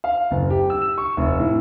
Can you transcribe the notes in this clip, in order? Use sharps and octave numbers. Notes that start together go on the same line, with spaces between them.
F5
F#1
G4
E6
E7
C#6
F1
A2